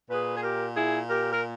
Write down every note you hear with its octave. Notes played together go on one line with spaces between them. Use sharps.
A#2 G#4 B4
G#4
G4 A#4
E4 G#4
G4 A#4
A#4